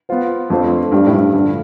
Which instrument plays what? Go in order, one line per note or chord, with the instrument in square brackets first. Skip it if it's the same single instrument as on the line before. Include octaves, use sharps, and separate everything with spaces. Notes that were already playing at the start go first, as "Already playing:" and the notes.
[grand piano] B3 F4 C5
[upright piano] F2 [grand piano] A3 D4 F4 C5
[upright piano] G2 [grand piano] G3 D4 G4 D5
[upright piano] A2
G2
[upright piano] G2 [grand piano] D3 F3 A3